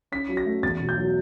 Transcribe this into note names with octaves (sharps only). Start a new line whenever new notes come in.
C#4 B6
F#3
A#6
A3
E2 A6
B2
G6
F#3